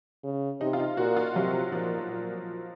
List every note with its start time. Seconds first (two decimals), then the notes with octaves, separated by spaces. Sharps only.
0.24 C#3
0.61 C3 D#4
0.73 F4
0.79 D#4
0.97 A#2 F#4
1.17 F4
1.35 C3 F#3
1.72 A#2 F3
2.10 A#2